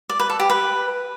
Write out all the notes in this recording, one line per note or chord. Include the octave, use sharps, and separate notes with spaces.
D5
B4
A4
G4
B4